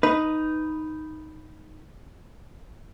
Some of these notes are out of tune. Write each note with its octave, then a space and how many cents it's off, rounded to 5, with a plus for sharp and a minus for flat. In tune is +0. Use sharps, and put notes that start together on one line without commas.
D#4 +0 B4 +0